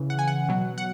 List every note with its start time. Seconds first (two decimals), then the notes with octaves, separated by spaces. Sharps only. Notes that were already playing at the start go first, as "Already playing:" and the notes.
Already playing: C#3 E3
0.10 F#5
0.19 G#5
0.28 F#5
0.48 B2 F#3
0.78 F#5